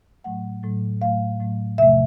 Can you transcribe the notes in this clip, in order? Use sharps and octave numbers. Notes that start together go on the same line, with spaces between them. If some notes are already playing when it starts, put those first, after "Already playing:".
A2 F#3 A3 F#5
A2 F#3 A3
A2 F#3 A3 F5
A2 F#3 A3
E2 C3 F3 A3 E5